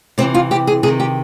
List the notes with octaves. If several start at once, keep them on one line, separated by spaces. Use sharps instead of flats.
C3 E3 C4
F4
G4
G#4
C3 D#3 G#4
G4